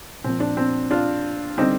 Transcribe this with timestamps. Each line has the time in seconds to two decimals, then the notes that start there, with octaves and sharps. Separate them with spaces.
0.24 A#2 F3 C4
0.40 D4
0.57 C4
0.91 D4 F4
1.58 D3 G3 C4 D#4